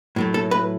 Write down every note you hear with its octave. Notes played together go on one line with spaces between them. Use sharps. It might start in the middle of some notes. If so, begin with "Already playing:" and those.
A2 F#3 A3
A4
B4